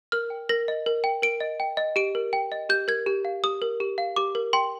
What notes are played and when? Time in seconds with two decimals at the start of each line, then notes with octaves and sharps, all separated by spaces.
0.12 A#4 F6
0.30 G5
0.49 A#4 A#6
0.68 D#5
0.86 A#4
1.04 G5
1.22 A#4 D7
1.40 D#5
1.60 G5
1.77 D#5
1.96 G4 D7
2.15 A#4
2.33 G5
2.52 D#5
2.69 G4 G6
2.88 A#4 G#6
3.06 G4
3.25 F5
3.44 G4 D#6
3.62 A#4
3.80 G4
3.98 F5
4.16 G4 D6
4.35 A#4
4.53 G5 C6